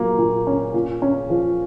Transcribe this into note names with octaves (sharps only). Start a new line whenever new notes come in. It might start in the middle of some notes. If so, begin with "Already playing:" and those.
Already playing: A#2 F#3 A#3
A#2
C#4
A#2
C#4
F3